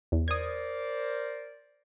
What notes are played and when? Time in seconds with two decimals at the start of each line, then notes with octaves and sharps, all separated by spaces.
0.12 E2
0.28 A#4 C5 D5 D#6 G#6